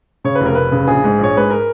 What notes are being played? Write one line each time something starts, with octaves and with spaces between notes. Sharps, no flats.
C#3 C#5
B4
F1
A#4
F1 B4
C#3
A#1 G#4
G#2
A#1 C#5
G#2 B4
A#4